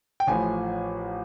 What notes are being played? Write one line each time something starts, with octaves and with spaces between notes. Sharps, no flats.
G5
A1 A2 F3 G#5